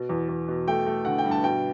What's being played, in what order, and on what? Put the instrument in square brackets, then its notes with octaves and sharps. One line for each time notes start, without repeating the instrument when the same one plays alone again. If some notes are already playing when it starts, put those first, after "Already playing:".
Already playing: [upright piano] B2
E2
E2
B2
A3 G5
A3
D3 F#5
G5
G2
A5
B2 G5